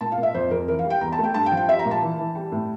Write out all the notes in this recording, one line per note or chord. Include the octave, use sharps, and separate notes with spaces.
A#2 A5
F5
A#2
E5
F2 C5
F2 A#4
E3 A#4
F5
G3
G5
E2 A#5
A5
A3
G5
G2 A5
G5
F3
G5
G3 E5
A#5
A#2
A5
E3
E3
G3
A2